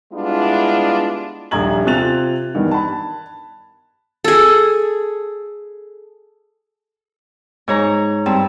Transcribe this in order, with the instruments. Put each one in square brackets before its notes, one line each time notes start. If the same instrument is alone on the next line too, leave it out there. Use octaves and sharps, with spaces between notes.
[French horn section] G3 G#3 B3 D4 E4 F4
[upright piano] D#1 A#1 A#5 G#6 F#7
C3 C4 F4 F#6 A6 F7
E2 G2 D#3
A5 B5
[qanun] G#4 A4
[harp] G#2 C#5 A#5
G2 C4 A5